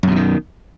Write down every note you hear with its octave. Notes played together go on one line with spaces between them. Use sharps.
F#2 B2 D3 D#3